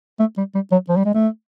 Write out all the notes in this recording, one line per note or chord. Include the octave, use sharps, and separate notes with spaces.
A3
G3
G3
F#3
F3
G3
G#3
A3